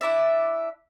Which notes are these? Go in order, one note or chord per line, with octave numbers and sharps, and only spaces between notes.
D4 E4 D5 E5